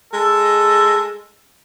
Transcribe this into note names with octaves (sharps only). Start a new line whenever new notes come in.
G#3 A4